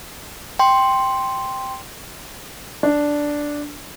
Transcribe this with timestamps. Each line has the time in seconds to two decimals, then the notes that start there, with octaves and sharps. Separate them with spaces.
0.59 G5 C6
2.83 D4